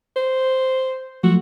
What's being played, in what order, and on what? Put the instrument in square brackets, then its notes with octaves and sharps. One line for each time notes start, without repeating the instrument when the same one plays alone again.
[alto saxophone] C5
[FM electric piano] F3 F#3 A3 [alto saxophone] F#4